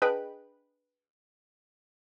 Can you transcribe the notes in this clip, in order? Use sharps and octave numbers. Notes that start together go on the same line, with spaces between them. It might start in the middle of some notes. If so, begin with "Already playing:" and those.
D4 G#4 B4 D#5 G5 B5